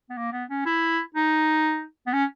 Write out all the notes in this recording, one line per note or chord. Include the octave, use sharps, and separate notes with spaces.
B3
A#3
B3
C#4
E4
D#4
B3
C#4